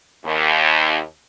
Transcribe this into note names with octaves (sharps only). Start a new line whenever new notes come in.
D#2